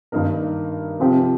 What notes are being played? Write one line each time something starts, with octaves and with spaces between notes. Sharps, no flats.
G2 D#3 A#3 D#4 A#4
C3 F3 C4 G4